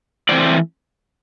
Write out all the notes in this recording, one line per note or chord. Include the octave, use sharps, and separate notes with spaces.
A2 E3 A3 C4 C5 D5